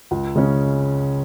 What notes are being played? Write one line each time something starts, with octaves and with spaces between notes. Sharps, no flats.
C#2
C#3 G#3 C#4